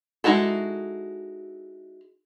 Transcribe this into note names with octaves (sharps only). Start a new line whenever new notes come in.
G#3 D#4 E4 F#4 A4